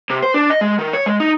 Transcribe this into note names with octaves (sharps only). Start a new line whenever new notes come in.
C3
C5
D4
D#5
G#3
D#3
C#5
G#3
D#4